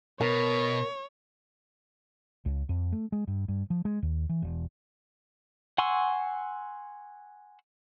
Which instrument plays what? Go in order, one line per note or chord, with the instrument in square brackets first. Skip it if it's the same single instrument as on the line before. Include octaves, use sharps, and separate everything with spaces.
[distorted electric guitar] B2 [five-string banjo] A#4 [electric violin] C#5
[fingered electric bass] C#2
F2
A3
G#3
G2
G2
F3
G#3
D#2
E3
E1
[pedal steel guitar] F#5 G#5 C6 C#6 E6